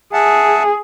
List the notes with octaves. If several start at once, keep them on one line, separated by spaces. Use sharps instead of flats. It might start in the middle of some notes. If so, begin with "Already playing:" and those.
G#4 E5 F#5 A5